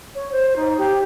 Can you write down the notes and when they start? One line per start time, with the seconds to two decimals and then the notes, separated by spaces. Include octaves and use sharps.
0.15 C#5
0.31 C5
0.55 D#4
0.78 G4